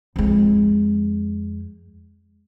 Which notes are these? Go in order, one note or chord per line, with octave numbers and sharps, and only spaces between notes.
F2 G#3